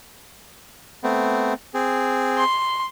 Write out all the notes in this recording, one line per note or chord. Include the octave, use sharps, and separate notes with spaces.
A3 B3 C4
C4 G#4
C6